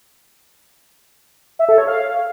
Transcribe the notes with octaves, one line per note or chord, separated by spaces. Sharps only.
E5
A4
C#5
F5